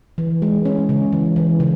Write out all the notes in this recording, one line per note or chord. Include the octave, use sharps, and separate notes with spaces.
E3
G#3
C#4
C#3
E3
E3
C#3